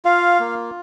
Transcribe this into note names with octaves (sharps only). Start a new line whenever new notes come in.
F4 F5
A#3